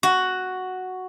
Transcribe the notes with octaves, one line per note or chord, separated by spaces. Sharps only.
F#4